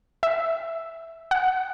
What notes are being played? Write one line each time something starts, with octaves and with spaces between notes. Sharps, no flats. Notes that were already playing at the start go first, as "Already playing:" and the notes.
E5
F#5